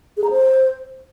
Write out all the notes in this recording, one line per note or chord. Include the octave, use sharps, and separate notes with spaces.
G#4
A#5
C5